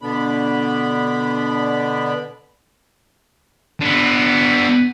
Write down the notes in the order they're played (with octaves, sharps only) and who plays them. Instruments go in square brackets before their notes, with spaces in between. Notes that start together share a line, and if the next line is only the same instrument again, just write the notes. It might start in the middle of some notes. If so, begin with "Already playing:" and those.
[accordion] B2 D3 B3 D4 B5
[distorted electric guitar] D3 B3